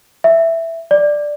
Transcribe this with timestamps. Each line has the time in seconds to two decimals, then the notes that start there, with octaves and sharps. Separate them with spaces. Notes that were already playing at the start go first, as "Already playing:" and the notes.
0.24 E5
0.91 D5